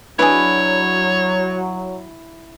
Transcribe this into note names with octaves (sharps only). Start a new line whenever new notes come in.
F#3 D4 E4 G#4 B4 C#5